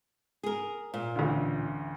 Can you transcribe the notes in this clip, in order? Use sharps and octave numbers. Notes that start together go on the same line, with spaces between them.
G#4 A#4
A#2
A1 D2